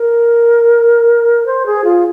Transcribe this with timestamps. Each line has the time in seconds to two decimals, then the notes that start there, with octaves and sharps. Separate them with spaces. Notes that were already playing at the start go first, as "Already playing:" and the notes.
Already playing: A#4
1.46 C5
1.66 G#4
1.84 F4